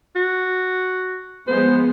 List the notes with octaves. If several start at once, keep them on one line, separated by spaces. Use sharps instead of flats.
F#4
F3 G#3 B3 C5